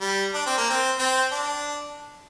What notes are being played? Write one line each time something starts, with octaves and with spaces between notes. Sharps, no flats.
G3
D4
C4
A#3
C4
C4
D4